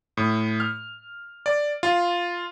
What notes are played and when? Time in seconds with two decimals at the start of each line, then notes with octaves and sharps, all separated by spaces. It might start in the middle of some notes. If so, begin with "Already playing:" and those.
0.17 A2
0.60 F6
1.46 D5
1.83 F4